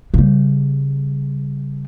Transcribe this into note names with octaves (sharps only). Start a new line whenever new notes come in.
C#3 G3